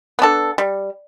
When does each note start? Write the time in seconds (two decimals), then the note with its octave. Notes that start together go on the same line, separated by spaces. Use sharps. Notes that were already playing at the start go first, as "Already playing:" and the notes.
0.19 B3 D4 A4
0.58 G3